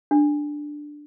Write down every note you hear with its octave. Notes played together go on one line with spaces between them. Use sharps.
D4